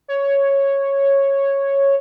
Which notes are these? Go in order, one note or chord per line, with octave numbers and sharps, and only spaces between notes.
C#5